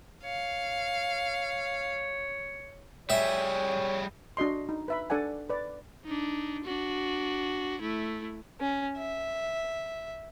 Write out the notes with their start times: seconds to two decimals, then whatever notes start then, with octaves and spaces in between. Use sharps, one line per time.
0.24 C#5 F5
3.10 G3 G#4 C#5 E5
4.37 D4 F#4 D#5 C6
4.69 D#4
4.88 B4 E5 B5
5.10 D4 A4 D5 F#5 G#5
5.50 B4 D5
6.05 D4 D#4
6.64 D4 F#4
7.81 A3 E4
8.60 C#4
8.97 E5